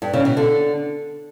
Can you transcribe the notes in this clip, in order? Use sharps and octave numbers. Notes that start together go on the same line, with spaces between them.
G2
C#3
B2
D3